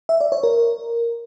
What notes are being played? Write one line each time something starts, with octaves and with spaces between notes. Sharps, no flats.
E5
D5
C#5
A#4